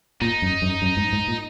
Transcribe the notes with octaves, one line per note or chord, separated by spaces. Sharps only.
A#2 D#4
F#2
F#2
F#2
G#2
G#2
A#2